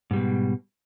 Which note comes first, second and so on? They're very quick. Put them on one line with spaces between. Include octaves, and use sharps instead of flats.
G#2 G3 B2